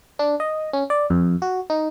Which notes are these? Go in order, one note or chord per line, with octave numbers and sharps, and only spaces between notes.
D4
D#5
C#4
D5
F2
F#4
D#4